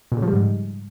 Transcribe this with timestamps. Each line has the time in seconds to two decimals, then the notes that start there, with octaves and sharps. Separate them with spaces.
0.12 A#2
0.17 C#3
0.22 F3
0.28 G3
0.33 G#2